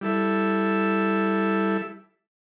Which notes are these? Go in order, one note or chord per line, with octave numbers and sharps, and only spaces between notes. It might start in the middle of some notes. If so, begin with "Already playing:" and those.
G3 E4 A4 E5